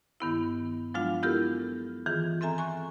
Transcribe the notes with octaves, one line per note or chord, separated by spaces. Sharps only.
G2 D#3 B3 E4
F3 F#3 G#3 D4 F4 F5
B3 E4 F4 G4 A4 A#4
D#3 E3 F4 G#4
C4 A4 E5 G#5 A#5
G#5 C#6 F#6